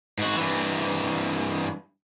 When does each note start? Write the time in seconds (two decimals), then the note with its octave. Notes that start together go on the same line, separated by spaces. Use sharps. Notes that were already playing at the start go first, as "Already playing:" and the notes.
0.18 G#2 F#4
0.36 G2 E3